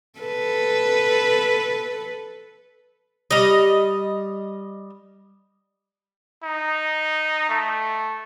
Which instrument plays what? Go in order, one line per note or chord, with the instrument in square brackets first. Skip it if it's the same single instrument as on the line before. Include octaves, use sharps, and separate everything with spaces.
[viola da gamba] A4 B4
[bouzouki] G3 D#5
[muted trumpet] D#4
A3